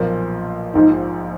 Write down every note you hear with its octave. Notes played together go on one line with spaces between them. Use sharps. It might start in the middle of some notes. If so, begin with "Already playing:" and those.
Already playing: B1 A#2 F3 A#3
A#1 G#2 F3 D#4